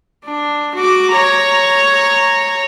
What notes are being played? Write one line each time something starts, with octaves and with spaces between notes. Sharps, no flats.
D4
F#4 D6
C#5 A#5